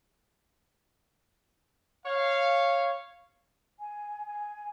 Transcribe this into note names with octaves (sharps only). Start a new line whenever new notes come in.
C#5 F5
G#5
G#5